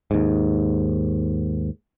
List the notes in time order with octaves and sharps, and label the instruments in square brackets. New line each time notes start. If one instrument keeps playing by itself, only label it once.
[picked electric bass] D#2 G#2